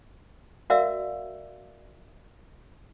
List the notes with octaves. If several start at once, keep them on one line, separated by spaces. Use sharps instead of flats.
F#4 A#4 D5 E5 F5 E6